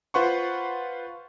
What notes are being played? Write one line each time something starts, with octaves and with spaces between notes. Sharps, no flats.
F4 B4 C5 F#5 C6 C#6